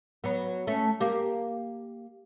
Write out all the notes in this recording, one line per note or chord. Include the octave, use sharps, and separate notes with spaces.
F#3 B3
A3 C#4
A#3 G4